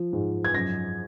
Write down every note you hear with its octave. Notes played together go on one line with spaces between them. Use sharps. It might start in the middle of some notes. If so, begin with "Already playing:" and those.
Already playing: F3
G#2
G#6
F#2 A#6